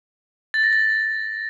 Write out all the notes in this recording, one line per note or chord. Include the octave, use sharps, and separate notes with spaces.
A6
A#6
A6